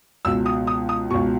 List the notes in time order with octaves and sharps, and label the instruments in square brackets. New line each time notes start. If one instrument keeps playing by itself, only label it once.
[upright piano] C#2 B2 E6
D#6
D#6
D#6
B2 C#6
C#2